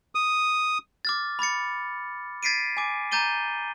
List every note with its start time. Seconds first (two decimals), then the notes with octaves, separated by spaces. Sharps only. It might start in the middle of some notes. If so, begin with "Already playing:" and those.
0.15 D#6
1.05 D6 F6 A6
1.39 B5 D6 A6 C#7
2.43 G#6 A6 B6 C7 D7 D#7
2.77 G#5 D6
3.12 A#5 D6 G6 A6 D#7 G7